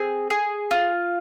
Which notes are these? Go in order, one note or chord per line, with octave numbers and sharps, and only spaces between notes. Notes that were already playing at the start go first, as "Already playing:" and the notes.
Already playing: C4 G#4
G#4
F4